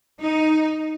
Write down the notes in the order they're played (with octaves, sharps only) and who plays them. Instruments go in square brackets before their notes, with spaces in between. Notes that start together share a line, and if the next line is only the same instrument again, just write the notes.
[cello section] D#4